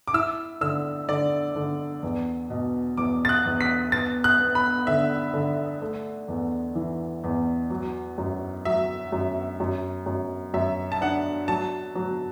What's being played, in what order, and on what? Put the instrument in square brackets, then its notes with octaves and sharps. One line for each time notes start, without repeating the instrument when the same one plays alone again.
[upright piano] D6
[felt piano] E4 [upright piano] E6
[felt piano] D3 [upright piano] E6
[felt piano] D3 [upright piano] D5
[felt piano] D3
E2
B2
[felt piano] E2 [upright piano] D6
[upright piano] A6
F#6
[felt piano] E2
[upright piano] B6
[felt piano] B3 [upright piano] A6
[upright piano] F#6
[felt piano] B3
[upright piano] B5
[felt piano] D3 [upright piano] E5
[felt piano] D3
A3
E2
E3
E2
F#3
F#2
[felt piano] F#3 [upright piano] E5
[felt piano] F#2
F#2
F#2
[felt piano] F#2 [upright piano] E5
[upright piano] A5
[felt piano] D4 [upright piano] F#5
[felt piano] F#3 [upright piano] A5
[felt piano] F#3